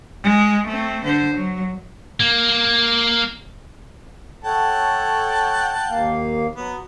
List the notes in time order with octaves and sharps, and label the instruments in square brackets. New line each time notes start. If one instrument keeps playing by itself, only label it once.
[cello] G#3
A3 C4
D3 C5
F#3
[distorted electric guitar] A#3
[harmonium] A4 C#5 [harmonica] F#5 G5 A5
[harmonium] D#2 A#3 F5
[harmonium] F#3 [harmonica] B3